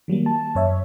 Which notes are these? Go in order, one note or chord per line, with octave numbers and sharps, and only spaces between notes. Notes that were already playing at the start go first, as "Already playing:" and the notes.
D#3 F#3 G3 A#3
A5
F#2 C#5 E5